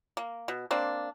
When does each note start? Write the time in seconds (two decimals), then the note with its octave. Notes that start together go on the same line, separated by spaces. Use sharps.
0.17 A#3
0.48 B2
0.71 A#3 C4 D4